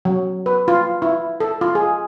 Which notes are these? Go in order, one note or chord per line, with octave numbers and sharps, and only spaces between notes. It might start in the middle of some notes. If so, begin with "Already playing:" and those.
F#3
B4
F4
E4
A4
F4
G#4